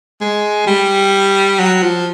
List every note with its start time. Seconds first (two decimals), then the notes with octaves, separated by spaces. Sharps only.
0.21 G#3
0.67 G3
1.59 F#3
1.83 F3